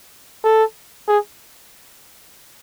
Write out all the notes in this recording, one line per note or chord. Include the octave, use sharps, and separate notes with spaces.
A4
G#4